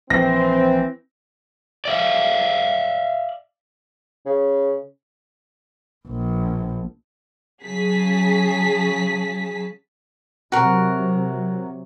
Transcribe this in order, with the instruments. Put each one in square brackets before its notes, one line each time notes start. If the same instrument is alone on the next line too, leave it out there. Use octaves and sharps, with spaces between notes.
[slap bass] A#1 [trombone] E3 [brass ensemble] C4 [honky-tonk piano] A#6
[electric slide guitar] D5 E5 F5
[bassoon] C#3
[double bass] A#1
[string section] C#3 F#3 G#4 A5 B6
[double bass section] C3 F#3 [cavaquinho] F#4 A#4